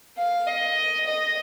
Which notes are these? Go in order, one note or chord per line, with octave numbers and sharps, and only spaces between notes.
F5
D#5
D#5